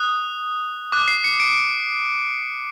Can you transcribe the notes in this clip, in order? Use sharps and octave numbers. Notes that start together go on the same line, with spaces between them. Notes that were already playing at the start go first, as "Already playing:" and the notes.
Already playing: D#6 F#6
D6 F#6
C7
C#7
D7